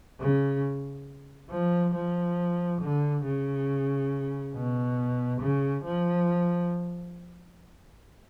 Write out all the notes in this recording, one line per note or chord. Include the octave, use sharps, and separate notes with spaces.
C#3
F3
F3
D3
C#3
B2
C#3
F3